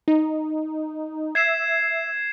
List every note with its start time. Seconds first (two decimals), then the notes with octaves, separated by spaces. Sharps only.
0.08 D#4
1.35 E5 G#6 C7 E7